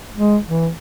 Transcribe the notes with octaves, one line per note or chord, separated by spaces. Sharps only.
G#3
E3